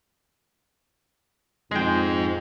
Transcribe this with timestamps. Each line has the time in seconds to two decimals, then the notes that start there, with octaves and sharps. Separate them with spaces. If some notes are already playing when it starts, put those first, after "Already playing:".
1.71 F2 G#3 D#4 G#4 G5